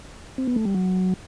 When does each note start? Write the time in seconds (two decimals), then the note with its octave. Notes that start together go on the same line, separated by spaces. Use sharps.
0.38 C4
0.47 B3
0.56 A3
0.65 G3
0.74 F#3